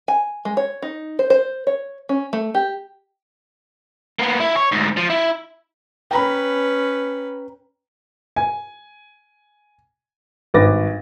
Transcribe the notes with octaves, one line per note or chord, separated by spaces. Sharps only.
G#5
G#3
C#5
D#4
C5
C5
C#5
C#4
A3
G4
A#3 B3
E4
C#5
D2 G#2
F3
E4
C#4 B4 G5 A#5 B5
G#5
G#1 G2 B4 D6 A6 A#6